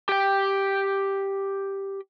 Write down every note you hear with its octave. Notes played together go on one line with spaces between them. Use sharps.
G4 G5